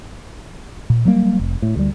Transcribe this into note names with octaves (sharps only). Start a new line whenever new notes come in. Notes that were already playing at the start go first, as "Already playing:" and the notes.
A#2
F#3 G3 A#3
F1
A2
D2 G3